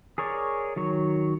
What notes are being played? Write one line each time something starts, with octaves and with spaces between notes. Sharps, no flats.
G#4 A#4 C#5 D5
D#3 F#3 C#5